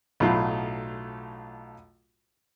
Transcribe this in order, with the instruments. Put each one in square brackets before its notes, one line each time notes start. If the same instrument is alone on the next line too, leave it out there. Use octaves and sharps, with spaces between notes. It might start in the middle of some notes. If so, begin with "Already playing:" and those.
[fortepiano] B1 A2 F#3 F4 B5